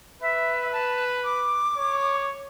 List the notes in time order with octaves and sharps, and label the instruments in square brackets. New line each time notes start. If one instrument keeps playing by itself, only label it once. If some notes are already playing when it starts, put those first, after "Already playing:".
[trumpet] B4 [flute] E5
[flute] A5
D6
[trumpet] C#5